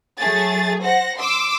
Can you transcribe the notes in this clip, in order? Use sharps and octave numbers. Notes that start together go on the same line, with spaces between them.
F#3 A3 G#4 A6
C5 F#5 A#6
C6 D6 E6